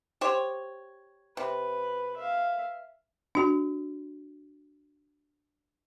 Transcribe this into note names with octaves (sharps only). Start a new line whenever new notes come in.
G4 C5 C#5
C3 B4
E5 F5
D4 F#4